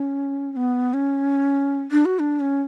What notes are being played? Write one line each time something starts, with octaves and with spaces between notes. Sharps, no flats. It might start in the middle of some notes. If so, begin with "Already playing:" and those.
Already playing: C#4
C#4
B3
C#4
D4
F#4
D4
C#4